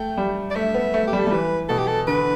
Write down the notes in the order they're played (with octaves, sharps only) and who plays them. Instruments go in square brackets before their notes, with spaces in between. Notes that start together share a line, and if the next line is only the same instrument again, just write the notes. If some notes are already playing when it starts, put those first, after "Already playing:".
Already playing: [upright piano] A3 [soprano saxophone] G5
[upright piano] G3
[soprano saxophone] D5
[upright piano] A3 [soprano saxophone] E5
[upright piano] B3
A3
[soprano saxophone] G4
[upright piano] G3
[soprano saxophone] A4
[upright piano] G3
[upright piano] E3 [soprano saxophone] B4
[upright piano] B2 [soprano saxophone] A4
[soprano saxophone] G4
A4
[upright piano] D3 [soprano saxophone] B4